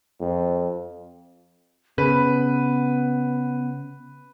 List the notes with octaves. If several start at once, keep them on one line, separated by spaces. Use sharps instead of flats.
F2
C#3 B3 B4